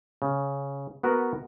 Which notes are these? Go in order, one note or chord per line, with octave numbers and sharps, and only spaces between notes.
C#3
B3 F#4 A#4 B4